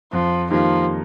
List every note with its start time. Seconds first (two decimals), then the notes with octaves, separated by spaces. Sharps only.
0.13 F2 F3
0.50 D#3 F3 G3 A#3 D#4